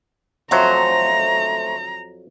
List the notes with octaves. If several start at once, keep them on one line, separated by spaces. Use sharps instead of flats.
F2 F#3 A3 C5 A#5